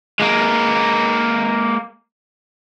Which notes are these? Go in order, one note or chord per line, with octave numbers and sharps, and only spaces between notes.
G#3 A#3